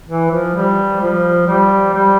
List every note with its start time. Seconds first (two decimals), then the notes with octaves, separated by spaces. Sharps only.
0.08 E3
0.31 F3
0.55 G3
1.01 F3
1.47 G3
1.94 G3